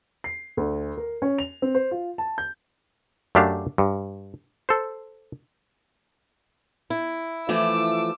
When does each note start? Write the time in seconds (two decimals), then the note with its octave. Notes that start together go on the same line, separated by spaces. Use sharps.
0.24 C7
0.57 D2
0.97 A#4
1.22 C#4
1.39 F7
1.62 C4
1.75 C5
1.91 F4
2.18 A5
2.38 G6
3.35 F#2 A3 D4 G4 F5 A5
3.78 G2
4.69 A4 C5
6.90 E4
7.49 E3 F3 A3 D6 E6